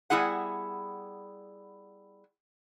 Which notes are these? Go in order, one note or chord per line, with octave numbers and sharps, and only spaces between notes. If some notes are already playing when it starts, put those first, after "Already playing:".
G3 B3 E4 G#4 F#5